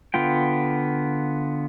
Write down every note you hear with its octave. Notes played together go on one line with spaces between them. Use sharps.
D3 B3 F4 G5